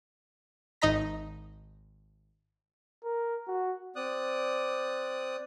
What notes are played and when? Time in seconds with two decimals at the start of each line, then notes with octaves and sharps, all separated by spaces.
0.82 G#1 D#4 D#5 A#5 B6
3.04 A#4
3.47 F#4
3.96 C4 D5 D#6 F#6